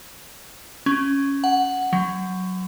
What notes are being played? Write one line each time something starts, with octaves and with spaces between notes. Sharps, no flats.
C#4
F#5
F#3